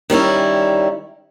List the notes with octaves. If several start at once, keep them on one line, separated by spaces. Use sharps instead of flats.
D#3 G3 C#4 E4